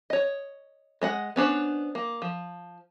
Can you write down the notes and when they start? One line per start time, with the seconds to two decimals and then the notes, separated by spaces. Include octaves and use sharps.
0.10 C#5 D#5
1.01 G#3 D#5 F#5
1.36 B3 C#4 D4 C5
1.95 A#3
2.22 F3